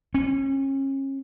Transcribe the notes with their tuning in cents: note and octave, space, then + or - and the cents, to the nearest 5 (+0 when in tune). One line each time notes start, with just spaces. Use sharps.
C#4 -35